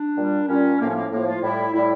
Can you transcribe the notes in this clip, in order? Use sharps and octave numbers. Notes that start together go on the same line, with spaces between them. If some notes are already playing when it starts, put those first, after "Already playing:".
Already playing: D4
A#2 G3
A#2 G3 C#4
A2 F3 A#3
C#4
A#3
A2 F3 A#3
F4
A2 G3 E4
A2 G3 E4